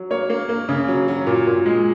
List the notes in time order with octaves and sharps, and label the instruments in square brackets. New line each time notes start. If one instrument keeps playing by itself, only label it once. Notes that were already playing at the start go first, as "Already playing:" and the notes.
Already playing: [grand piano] F#3
A#3 C#5
A#3
A#3
C#3
F#3
F#3
A#2
A#2
G#3